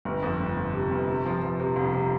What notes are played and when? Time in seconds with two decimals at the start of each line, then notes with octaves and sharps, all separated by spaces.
0.05 G1
0.22 F2
0.40 G1
0.57 G1
0.74 C3
0.91 G1
1.08 C3
1.26 F3
1.42 F3
1.60 C3
1.76 F1
1.93 C3